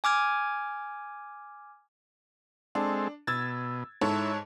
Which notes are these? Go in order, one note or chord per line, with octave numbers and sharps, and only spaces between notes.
G#5 D6 F6 G#6
G#3 C4 D4 A4
B2 E6 G#6 A6
G#2 E4 A4 C#5